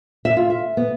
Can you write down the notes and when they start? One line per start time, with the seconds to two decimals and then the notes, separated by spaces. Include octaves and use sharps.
0.25 E5
0.37 F4
0.50 E5
0.77 B3